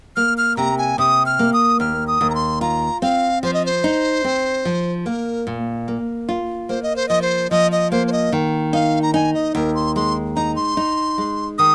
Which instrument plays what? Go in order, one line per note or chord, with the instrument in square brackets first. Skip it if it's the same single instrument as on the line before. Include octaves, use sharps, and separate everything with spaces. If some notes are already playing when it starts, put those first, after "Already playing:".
[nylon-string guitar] A#3 [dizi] F6
[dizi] F6
[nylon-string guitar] C3 [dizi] A#5
[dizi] G#5
[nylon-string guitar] C3 [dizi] D#6
[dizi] F6
[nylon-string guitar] A#3
[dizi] D#6
[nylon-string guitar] D#2 [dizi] F6
[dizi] D#6
[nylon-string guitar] D#2
[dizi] A#5
C6
[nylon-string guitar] F4 [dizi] A#5
[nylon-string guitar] C4 [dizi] F5
[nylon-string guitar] F3 [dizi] C5
[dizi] D#5
C5
[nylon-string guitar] D#4
C4
F3
[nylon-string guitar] A#3 [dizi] A#4
[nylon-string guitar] A#2
A#3
F4
[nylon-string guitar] A#3 [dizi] C5
[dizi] D#5
C5
[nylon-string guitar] F3 [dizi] D#5
[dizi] C5
[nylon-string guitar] F3 [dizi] D#5
[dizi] D#5
[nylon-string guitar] A#3 [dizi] C5
[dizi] C5
D#5
[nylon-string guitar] D#3
[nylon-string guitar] D#4 [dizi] F5
[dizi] A#5
[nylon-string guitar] D#4 [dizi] G#5
[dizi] D#5
[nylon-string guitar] D#2 [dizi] A#4
[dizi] C6
[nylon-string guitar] G#3 [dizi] C6
[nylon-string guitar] D#4 [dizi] A#5
[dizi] C6
[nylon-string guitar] D#4
G#3
[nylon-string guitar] D#3 [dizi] D#6